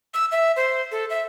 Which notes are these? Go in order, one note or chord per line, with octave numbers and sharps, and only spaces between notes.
E6
E5
C5
A4
E5